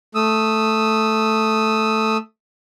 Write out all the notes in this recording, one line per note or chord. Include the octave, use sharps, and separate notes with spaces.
A3 D#6 E6